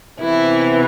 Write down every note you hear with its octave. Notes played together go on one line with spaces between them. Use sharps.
C3 E3 B3 E4